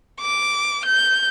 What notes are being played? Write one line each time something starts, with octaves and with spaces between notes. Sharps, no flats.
D6
G6